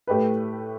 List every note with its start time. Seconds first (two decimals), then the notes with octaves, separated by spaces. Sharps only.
0.07 A2 A3 G4 B4